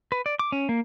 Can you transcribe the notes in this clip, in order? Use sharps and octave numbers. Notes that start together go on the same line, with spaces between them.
B4
D5
D6
C#4
A#3